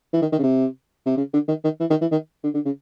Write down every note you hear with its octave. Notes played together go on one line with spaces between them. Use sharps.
E3
D#3
D#3
C#3
C3
C3
C#3
D3
D#3
D#3
E3
D#3
E3
D#3
D3
D3
C#3